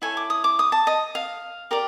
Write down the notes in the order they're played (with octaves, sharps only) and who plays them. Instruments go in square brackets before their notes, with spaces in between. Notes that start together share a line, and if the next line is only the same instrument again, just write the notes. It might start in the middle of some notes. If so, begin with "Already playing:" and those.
[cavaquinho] E4 A4 C#5 G#5
D6
D#6
D6
D#6
A5
D#5
F5
G4 A#4 D5